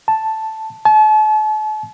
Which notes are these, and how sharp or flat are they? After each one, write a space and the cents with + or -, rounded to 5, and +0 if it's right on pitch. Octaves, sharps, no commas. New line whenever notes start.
A5 +0
A5 -40